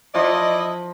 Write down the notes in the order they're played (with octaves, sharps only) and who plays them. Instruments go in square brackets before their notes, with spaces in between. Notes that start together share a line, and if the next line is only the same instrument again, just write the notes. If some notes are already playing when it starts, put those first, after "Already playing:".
[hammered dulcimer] F3 [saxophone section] E4 D5 D#5